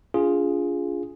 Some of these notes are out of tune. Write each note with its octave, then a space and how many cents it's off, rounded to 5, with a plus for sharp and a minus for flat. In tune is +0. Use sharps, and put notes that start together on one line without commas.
D4 -45 F4 +0 G#4 +0